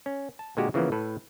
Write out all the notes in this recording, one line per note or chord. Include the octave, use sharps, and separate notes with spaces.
C#4
A5
A#2 D3 G#3 A#3 F#4 G4
C#3 E3 F3 A#3 B3
A2 A4 B4